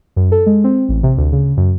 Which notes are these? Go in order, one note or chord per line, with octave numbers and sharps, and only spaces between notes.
F#2
A4
G#3
C4
A1
C3
D2
C#3
F#2